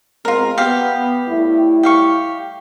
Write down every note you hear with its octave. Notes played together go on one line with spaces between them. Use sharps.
B2 G#3 C4 F4 A#4
B3 G4 F5
A2 G3 E4
G4 F5 C#6